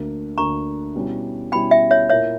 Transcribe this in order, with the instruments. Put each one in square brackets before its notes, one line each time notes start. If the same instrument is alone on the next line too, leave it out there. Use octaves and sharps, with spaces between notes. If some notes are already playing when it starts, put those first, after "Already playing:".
Already playing: [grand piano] D2 D3 A#3
[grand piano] D2 D3 A#3 [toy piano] A#5 C#6
[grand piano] B2 G3 C#4 E4
[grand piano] B2 G3 C#4 E4 [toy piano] G5 B5
[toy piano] E5 G5
C#5 E5
[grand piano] A#2 A#3 E4 [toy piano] C#5 E5